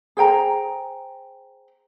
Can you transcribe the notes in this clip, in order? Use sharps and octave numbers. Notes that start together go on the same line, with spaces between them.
G#4 C5 G5 A#5